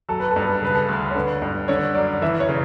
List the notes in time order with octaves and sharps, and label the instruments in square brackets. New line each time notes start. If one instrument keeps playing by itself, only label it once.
[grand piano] F#3 [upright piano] A4
[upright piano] B4
A4
[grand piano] G2
[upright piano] B4
A4
[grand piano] C#3 [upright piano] B4
[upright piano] A4
[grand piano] D2
[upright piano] C#5
[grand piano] D3 [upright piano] B4
[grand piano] G2
[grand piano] D3 [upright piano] C#5
[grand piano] F#2 [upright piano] D5
[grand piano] E3 [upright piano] E5
[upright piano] C#5
[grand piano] C#3